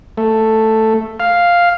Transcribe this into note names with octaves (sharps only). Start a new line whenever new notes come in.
A3
F5